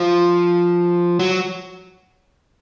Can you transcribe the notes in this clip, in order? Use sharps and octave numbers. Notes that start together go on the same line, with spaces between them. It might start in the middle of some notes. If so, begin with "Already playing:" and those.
Already playing: F3
F#3